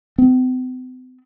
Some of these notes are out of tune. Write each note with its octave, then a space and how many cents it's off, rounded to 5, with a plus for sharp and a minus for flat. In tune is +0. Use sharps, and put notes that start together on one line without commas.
C4 -45